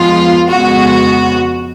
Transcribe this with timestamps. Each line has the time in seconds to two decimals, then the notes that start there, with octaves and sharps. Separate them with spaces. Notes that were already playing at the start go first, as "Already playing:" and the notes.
Already playing: F2 F3 G#3 B3 F4
0.49 F2 C#3 G#3 B3 F#4